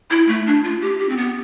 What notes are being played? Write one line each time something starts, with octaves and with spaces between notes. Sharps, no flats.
E4
A3
D4
F4
G4
G4
C4
B3